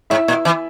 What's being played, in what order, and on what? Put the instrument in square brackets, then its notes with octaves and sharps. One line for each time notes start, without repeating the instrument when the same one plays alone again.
[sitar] G#2 [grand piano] E4 E5
[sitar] A#2
E3